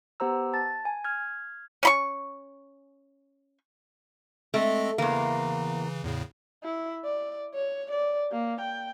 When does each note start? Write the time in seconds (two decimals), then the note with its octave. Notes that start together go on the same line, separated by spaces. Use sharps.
0.20 B3 G4 C5 A#5 E6
0.54 A5 A6
0.85 G#5
1.04 F6 G#6
1.83 C#4 B5 C#6
4.54 G#3 A3 C4 D#5
4.98 E2 C#3 E3 A#3
6.04 E2 A2 C#3
6.63 E4
7.05 D5
7.54 C#5
7.91 D5
8.32 A#3
8.61 G5